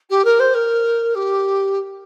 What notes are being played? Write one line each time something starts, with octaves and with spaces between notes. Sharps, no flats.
G4
A#4
C5
A#4
G4